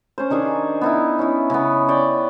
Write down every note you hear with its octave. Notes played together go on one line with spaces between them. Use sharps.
C#4 C5
D#3 D4 G#4 G#5
B3 D#4 E4
C#4 E4
C#3 B3
C#5 D5 G5